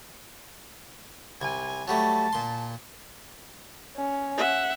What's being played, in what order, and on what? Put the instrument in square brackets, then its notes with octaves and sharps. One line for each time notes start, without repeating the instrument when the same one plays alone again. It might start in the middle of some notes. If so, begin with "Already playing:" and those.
[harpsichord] C2 [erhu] G#5
[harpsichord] F#3 G3 A3 [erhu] A5
[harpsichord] A#2 C6
[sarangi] C#4
[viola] E5 F#5